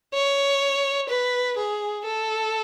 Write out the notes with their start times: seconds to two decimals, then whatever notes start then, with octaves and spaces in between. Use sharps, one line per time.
0.14 C#5
1.09 B4
1.58 G#4
2.05 A4